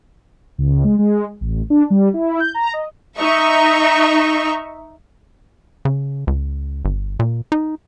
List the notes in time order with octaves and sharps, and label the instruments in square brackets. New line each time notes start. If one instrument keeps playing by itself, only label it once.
[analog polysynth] C#2
G#3
G#3
A1
D4
G3
E4
G6
A#5
D#5
[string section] D#4 E5 C#6
[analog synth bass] C#3
C#2
G1
A#2
D#4